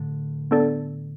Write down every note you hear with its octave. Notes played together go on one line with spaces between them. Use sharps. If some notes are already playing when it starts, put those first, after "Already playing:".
Already playing: A2 D3
B3 D4 A4 D5